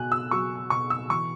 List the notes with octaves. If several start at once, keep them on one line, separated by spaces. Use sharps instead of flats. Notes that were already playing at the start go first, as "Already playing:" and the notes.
Already playing: B2 F#3 G#5 F#6
E6
F#3 C#6
B2 C#6
E6
E3 C#6